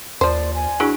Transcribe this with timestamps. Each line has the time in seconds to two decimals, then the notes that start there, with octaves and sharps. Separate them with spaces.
0.21 D#2 F3 C5 D5
0.54 G#5
0.80 F#3 D4 E4 G#4